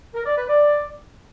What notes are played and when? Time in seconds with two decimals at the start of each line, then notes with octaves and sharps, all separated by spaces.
0.14 A#4
0.26 D5
0.38 B4
0.49 D5